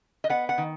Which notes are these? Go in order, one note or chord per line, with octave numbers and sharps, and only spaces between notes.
D#5
B3 F#5
F#5
D#3